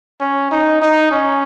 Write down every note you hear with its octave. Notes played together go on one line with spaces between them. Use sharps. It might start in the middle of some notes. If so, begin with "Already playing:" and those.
C#4
D#4
D#4
C#4